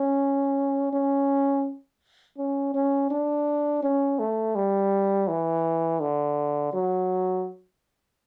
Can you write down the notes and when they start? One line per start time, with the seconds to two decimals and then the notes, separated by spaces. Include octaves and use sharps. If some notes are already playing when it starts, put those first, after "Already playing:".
Already playing: C#4
0.92 C#4
2.38 C#4
2.74 C#4
3.11 D4
3.83 C#4
4.19 A3
4.55 G3
5.28 E3
6.00 D3
6.73 F#3